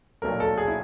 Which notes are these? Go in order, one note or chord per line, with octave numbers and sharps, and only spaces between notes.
B1 A#2 F#3 A3 A#4
A4
G#4
E4